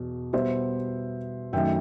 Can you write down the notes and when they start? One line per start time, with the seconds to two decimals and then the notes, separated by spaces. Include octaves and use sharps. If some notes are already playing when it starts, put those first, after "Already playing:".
Already playing: E2 B2
0.33 B2 G3 B3 C5 E5
1.53 F#2 D#3 A3 E5 G5